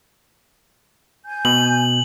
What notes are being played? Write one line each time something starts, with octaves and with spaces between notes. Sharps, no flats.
G#5 G6
B2 F#7